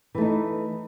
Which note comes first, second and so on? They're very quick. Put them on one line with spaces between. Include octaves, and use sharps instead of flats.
E3 A3 D#4